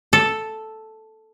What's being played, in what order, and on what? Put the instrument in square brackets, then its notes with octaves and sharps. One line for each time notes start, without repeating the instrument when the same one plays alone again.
[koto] A4